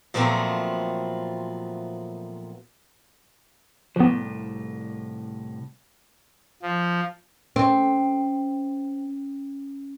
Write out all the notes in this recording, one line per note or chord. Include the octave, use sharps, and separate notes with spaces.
A#2 F3 F#3 A3 B3 C4
C2 A2 F3 B3
F3
C4 C#4